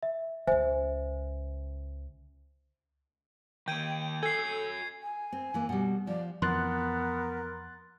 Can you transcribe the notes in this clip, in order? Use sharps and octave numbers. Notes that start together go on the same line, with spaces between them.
E5
C#2 C#3 C5 E5 G#5
D#3 A#3 G5 G6 G#6 D#7
F#4 A4 G#5 G#6 C7
G#5
C4
E3 A#3
B2 G3
F3 D5
F2 E3 B3 A#4 C6 F#6 A6